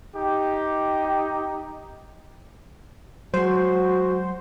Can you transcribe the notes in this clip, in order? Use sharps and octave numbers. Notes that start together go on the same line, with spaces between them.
D#4 G4
F#3 G#3 F#4 C5